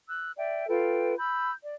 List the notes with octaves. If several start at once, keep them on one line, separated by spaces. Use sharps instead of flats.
E6 F#6
D5 E5 G5
F4 A4 B4 G5
B5 E6 G6
D5